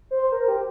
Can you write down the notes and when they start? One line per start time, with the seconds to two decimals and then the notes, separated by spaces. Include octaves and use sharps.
0.11 C5
0.32 A#4
0.48 G4